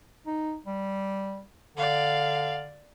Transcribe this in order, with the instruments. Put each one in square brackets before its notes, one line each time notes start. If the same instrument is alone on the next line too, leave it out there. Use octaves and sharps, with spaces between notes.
[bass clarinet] D#4
G3
[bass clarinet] D3 [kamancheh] D5 F5